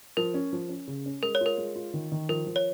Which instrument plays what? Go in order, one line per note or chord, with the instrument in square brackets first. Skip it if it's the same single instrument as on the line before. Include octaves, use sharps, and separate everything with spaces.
[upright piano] F3 [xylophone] A#4
[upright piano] C#4
F3
C#4
C#3
C#4
[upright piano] G#3 [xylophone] A#4
[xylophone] C#5
[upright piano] F4 [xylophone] A#4
[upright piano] G#3
F4
D#3
D#3
[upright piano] F3 [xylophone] A#4
[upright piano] F3
[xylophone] C#5